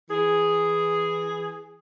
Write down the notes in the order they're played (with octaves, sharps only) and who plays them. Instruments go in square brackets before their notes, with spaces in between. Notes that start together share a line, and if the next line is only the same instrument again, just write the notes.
[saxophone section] E3 G#4